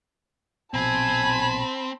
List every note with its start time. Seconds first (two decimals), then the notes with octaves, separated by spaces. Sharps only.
0.74 A#1 B2 C4 G#5 A5 B5